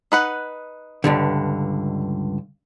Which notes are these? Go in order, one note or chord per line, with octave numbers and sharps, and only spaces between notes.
D#4 B4 F#5
C#2 G2 D3